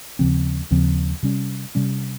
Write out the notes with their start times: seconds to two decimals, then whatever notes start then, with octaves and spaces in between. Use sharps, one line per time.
0.19 D#2 C#3 F3 C4
0.71 D#2 C#3 F3 C4
1.23 C3 G3 C#4
1.75 C3 G3 C#4